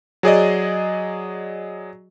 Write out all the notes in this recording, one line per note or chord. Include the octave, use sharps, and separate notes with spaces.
F#3 G#4 D5 D#5